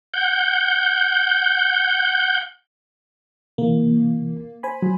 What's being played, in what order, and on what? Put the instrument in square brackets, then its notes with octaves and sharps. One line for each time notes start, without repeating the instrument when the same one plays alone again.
[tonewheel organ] F#5 G6
[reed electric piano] C3 E3 [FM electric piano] A#3
[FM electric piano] C5 G#5 B5
[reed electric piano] F#3